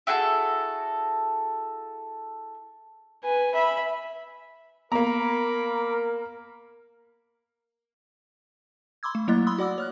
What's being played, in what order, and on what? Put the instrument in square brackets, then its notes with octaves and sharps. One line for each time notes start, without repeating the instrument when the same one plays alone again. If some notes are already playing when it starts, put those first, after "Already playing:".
[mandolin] E4 F#4 G#4 A4
[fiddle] B4 G#5
E5 B5
[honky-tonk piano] A#3 A#5 [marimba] B3 [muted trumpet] A#4 [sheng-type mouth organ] B5 D6
[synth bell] B5 C6 D6 E6 G#6
A3
F#3 A#3 E4 D#5 F#6 A6
B5 C6 D#6 E6
F#4 D5 F#5 D6 E6
C#5 F6 F#6